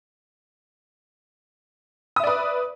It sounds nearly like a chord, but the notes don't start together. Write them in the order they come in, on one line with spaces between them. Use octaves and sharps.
D#6 E5 D5 B4